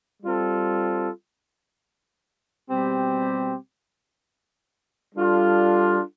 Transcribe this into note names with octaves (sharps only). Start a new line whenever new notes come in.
G3 C4 F4 A4
B2 G3 C4 G4
G3 D4 F4 A4